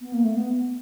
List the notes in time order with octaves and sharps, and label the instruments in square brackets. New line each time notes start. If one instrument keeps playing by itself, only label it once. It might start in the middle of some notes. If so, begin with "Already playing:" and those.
[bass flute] B3
A#3
A3
B3